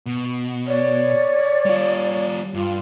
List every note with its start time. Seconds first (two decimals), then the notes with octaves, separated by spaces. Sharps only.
0.06 B2
0.67 C#5 D5
1.66 G3 F4
2.54 G2 F4